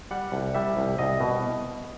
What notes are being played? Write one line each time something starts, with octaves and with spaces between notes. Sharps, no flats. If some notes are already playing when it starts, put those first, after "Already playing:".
G3 F#5
C2
G3 E5
C2
C2 D#5
B2